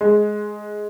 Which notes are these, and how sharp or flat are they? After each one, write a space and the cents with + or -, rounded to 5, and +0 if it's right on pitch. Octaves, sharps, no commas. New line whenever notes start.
G#3 +10